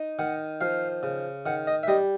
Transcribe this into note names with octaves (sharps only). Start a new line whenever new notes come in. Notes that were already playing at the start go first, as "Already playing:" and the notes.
Already playing: D#4
D#3 F#5
F3 F5
C#3
D#3 F#5
D#5
E5
G3 D#5